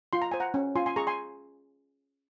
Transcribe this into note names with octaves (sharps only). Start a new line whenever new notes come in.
F4 C6
A#5
C5 G#5
F#5 A#5
C#4
F4 G#5 C6
G#5 C6
G#4 A#5 C#6
G#5 C6